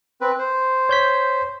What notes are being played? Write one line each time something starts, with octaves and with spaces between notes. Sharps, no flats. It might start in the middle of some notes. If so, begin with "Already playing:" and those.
C4 B4
C5
C#5 G6 B6